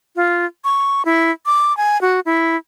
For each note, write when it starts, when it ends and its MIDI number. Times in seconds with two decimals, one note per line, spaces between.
0.16 0.45 65
0.64 1.05 85
1.05 1.31 64
1.46 1.75 86
1.77 2.00 80
2.01 2.20 66
2.26 2.57 64